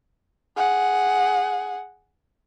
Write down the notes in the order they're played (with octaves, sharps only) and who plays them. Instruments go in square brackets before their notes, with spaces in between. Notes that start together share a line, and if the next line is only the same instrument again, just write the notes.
[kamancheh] G#4 F#5